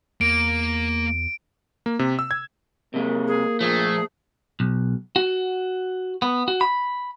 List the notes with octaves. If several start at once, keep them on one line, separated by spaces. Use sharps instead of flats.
E2 A#3 D7
A#3
C3
E6
G#6
C3 G#3 A#3
G#4
A#2 F3 A3 G#4
B1
F#4
B3
F#4
B5